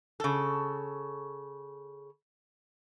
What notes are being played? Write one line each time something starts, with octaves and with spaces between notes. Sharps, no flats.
C#3 A4